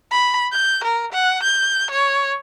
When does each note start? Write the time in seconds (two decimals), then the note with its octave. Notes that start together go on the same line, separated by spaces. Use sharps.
0.11 B5
0.52 G6
0.84 A#4
1.13 F#5
1.43 G6
1.91 C#5